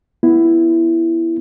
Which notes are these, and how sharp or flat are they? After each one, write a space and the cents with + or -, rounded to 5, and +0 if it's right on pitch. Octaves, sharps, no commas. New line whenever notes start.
B3 +0 E4 +10